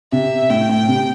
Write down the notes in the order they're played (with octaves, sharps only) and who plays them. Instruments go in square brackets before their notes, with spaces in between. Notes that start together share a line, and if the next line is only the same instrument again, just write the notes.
[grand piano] C3 [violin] E5
[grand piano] A2 [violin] G5
[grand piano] A2
C3